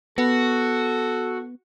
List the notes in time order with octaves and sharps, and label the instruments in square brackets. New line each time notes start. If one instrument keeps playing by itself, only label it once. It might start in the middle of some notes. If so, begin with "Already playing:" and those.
[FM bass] B3 [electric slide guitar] F#4 [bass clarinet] A4